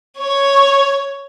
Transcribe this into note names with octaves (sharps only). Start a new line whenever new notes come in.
C#5 C#6